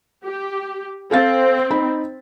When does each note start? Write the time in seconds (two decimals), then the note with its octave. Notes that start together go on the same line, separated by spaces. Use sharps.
0.23 G4
1.11 C4 A4 F5 A6
1.71 D#4 B5